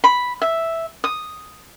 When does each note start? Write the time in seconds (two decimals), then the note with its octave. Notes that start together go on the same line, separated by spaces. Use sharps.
0.04 B5
0.42 E5
1.04 D#6